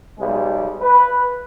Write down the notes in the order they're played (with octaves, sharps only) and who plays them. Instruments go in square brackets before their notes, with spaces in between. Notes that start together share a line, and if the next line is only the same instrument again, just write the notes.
[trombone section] B1 G3 G#3 G#4
B4